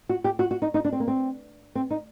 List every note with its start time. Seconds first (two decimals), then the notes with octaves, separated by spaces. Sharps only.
0.09 F#4
0.24 G4
0.39 F#4
0.51 F#4
0.62 D#4
0.74 D#4
0.85 D4
0.92 C4
1.00 A#3
1.08 C4
1.75 C4
1.90 D#4